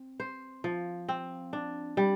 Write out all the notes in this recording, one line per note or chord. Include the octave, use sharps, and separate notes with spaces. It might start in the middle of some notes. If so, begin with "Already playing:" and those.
Already playing: C4
C5
F3
C4
D4
G3